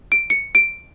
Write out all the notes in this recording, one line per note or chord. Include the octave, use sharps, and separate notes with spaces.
D7
C#7
D7